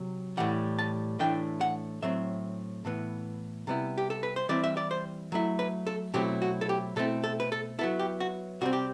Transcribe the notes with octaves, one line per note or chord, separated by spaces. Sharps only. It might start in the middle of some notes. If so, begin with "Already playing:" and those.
Already playing: C3 F#3
A2 E3 G3 F#5
A5
A2 E3 A3 D4 G5
F#5
A2 F#3 C4 E5
A2 E3 B3
C3 G3 B3 E4
G4
A4
B4
C5
E3 G3 C4 E4 D5
E5
D5
C5
F#3 A3 E4
B4
A4
B2 F#3 A3 C4 E4 G4
F#4
A4
G4
B2 A3 C4 E4 A4
A4
B4
A4
F#3 B3 E4 A4
G4
F#4
C3 G3 C4 F#4
G4